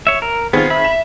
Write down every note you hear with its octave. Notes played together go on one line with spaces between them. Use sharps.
C#5 E5
A#4
D#3 B3 C4 F4 G#4
E5 B5
E7